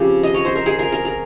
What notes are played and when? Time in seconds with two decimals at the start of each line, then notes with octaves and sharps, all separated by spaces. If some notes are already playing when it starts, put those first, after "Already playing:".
Already playing: C#3 F3 C4 G4
0.23 D#5
0.34 C#5
0.45 C5
0.56 A#4
0.66 G#4
0.79 A#4
0.92 A#4
1.05 A#4